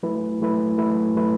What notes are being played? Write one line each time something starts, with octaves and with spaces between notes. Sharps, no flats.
F#3 A3 E4 B4
F#3 A3 E4 B4
F#3 A3 E4 B4
F#3 A3 E4 B4